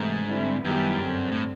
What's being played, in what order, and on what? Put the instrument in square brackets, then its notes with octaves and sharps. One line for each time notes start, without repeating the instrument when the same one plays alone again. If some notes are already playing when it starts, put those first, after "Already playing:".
Already playing: [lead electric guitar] G#2 [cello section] C3 E3 A3
[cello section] D3 G3 C4 E4
[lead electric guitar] F#2 [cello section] D#3 G3 B3 E4 G4
[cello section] G2 D3 G3 C4
[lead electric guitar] A2